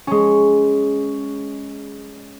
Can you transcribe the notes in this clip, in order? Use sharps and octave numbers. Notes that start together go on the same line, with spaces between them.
G#3 C#4